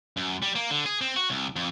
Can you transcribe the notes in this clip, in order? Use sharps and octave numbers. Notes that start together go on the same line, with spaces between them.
F#2
G3
A#3
D3
G#4
C4
F#4
C2
F2